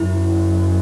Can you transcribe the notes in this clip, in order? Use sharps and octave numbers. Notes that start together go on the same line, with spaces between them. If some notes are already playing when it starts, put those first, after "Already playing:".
Already playing: F#2 E4